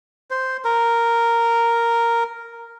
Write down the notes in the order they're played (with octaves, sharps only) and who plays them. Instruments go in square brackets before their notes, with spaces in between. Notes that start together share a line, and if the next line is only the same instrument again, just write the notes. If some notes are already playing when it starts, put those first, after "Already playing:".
[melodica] C5
A#4